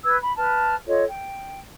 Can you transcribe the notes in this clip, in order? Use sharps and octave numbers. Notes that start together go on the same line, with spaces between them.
B4 E6 G#6
B5
B4 A5 F6
F4 A4 C#5 D#5
G5